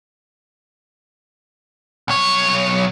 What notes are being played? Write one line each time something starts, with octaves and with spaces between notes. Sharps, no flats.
B1 C#5